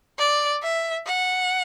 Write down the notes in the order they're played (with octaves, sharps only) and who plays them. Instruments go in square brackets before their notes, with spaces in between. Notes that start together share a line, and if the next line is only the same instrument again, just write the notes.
[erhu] D5
E5
F#5